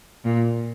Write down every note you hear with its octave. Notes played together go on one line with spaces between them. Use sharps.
A#2